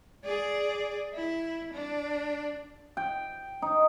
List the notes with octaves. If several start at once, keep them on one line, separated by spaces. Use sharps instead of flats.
G#4 D5
E4
D4
G5
D#4